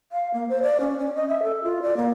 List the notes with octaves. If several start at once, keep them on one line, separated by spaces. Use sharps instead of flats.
F5
A#3
C5
D5
C#4
C#4
D#5
E5
A4
F4
D5
A#3